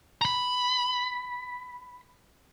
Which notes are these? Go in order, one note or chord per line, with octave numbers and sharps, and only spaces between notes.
A#5 B5